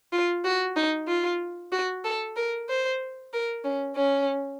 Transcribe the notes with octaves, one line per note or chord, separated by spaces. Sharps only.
F4
F#4
D#4
F4
F#4
A4
A#4
C5
A#4
C#4
C#4